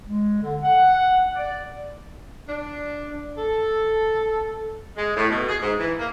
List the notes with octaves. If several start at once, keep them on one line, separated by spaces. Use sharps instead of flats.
G#3
D3
F#5
D5
D4
A4
G#3
A2
B2
G#4
G#2
E3
A#3